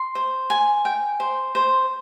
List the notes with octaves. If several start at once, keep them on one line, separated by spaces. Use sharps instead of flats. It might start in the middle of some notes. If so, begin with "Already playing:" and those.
Already playing: C6
C5
G#5
G5
C5
C5